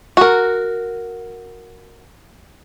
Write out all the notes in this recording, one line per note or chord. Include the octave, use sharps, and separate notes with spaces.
F#4 A#4